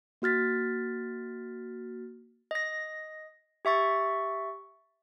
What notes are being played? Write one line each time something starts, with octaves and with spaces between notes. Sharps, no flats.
A#3 F#4 F6 A6 B6
D#5 A#6
G4 E5 C#6 A6